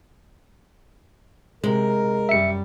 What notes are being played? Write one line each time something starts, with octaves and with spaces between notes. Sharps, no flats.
C3 G#3 A#4
F#2 G3 E5 C#7